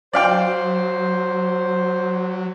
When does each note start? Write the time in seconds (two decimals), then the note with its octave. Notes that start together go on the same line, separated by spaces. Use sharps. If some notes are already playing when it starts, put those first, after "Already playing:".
0.13 F#3 C5 D5 F5 G5